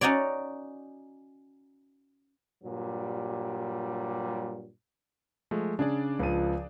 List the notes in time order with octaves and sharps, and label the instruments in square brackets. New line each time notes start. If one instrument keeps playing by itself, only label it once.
[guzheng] C#4 D#4 F#4 C#5 D5
[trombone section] G2 A#2 F#3 G3
[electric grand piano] F3 G#3 A3
[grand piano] C#3 [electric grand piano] D4 G#4 D5
[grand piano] C#2 F3 D#7